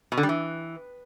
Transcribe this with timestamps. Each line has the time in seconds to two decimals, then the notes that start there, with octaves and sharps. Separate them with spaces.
0.12 B2
0.18 D3
0.23 G3
0.29 E3